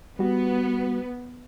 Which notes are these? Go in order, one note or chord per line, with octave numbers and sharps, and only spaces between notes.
G3 B3 F#4